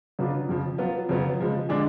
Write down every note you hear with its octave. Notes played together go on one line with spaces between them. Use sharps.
C#3 F#3 B3 D4 F4
F2 C#3 F3
F#3 B3 F4
F2 C#3 F#3 B3 F4
C#3 F3 G#3
D3 G#3 D4 G#4